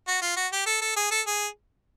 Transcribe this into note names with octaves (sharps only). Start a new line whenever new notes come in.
F#4
F4
F#4
G4
A4
A4
G#4
A4
G#4